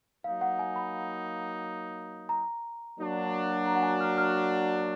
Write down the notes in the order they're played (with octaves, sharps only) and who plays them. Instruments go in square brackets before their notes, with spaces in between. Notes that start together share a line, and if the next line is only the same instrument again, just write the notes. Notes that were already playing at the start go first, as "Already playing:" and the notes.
[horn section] F#3 A#3 D#4 [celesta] F5
[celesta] F#5
G#5
B5
A#5
[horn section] F#3 A#3 D4 F#4
[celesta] A#5
F#5
G#5
F6
F6